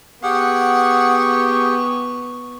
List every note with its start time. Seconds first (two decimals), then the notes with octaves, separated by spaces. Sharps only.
0.23 B3 G4 G#4 F#5 C#6